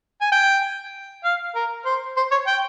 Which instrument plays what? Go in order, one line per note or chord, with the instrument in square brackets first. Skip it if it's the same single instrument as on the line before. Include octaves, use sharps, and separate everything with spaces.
[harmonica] G#5
G5
F5
A#4
C5
C5
C#5
G5